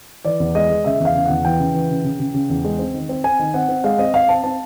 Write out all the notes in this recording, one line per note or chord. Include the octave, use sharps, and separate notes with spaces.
E3 D5
E2
G#3 D#5
G#3
C#3 E5
E2
F5
C#3
E2 F#5
E3 G5
C#3
E3
C#3
C#3
C#3
C#3
E2
G#3
C4
D#3
C4
C4 G#5
D#3
C4 F#5
C4
G#3 F5
C4 D#5
C4 F5
C4 A5
C4 A5